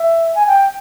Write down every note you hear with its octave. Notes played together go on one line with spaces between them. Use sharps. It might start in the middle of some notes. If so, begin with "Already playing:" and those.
Already playing: E5
G#5
G5